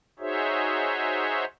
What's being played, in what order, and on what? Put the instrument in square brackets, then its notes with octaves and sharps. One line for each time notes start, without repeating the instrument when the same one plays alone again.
[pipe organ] D#4 F#4 G#4 C5 C#5 E5